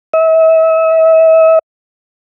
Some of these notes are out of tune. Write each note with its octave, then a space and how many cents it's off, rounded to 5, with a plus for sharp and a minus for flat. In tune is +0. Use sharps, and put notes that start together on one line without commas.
E5 -35